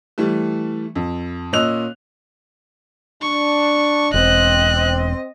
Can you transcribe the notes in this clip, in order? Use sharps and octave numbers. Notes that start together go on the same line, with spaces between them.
E3 G3 A3
F2
A#2 C#4 D#5 E6 F#6 F7
D4 C#6
E1 C4 D#5 F#6